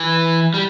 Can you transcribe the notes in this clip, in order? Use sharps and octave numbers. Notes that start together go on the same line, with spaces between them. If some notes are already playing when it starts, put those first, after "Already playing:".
Already playing: E3
G3